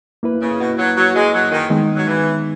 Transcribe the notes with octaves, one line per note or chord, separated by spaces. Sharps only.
A#3 E4 B4
C#3
B2
F#3
F#3
G#3
F#3
D#3
D#3 G#3 B3 D#4
F#3
E3